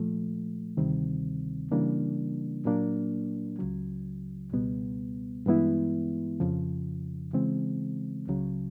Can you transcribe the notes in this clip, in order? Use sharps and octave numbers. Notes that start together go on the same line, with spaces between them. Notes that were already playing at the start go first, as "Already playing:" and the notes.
Already playing: A#2 F3 A3
D2 C3 D#3 G3 C4
C#3 E3 G3 A#3 D4
A#2 F#3 A#3 D4
C#2 C#3 F#3
C#2 B2 G3 B3
G2 E3 G#3 B3 E4
F2 C#3 F3
C#3 E3 G#3 C4
C#2 C#3 F#3